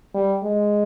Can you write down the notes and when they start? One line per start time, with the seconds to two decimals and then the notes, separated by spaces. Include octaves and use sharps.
0.14 G3
0.43 G#3